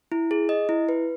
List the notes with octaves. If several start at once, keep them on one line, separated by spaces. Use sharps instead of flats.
E4
G#4
D#5
E4
B4